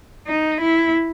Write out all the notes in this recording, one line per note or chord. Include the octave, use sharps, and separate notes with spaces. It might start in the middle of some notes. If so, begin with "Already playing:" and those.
D#4
E4